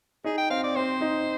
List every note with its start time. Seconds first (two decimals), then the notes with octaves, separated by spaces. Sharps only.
0.24 D#4 G#4
0.38 G5
0.50 C4 F5
0.64 D5
0.76 C4 C5
1.01 D#4